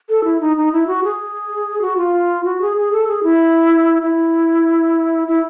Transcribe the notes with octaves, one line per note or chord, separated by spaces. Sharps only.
A4
E4
D#4
D#4
E4
F#4
G#4
F#4
F4
F#4
G#4
G#4
A4
G#4
E4
E4
E4